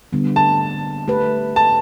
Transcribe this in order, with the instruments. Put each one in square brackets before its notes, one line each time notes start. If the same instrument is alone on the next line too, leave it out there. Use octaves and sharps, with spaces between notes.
[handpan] D3 G3 B3
[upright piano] A5
[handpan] A3 G4 B4
[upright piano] A5